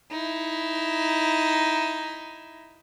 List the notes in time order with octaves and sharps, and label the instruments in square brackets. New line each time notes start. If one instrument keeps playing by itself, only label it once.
[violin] D#4 E4